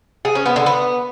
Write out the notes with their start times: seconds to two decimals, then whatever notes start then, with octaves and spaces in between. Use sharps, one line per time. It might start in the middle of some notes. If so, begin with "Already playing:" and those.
0.25 G#4
0.35 C#4
0.46 B3
0.56 D3
0.66 B3